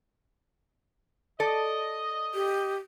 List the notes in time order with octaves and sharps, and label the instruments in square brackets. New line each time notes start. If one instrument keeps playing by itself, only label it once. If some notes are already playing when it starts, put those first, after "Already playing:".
[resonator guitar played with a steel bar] A4 D5 [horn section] D#5
[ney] G4